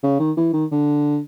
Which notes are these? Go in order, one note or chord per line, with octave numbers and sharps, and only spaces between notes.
C#3
D#3
E3
D#3
D3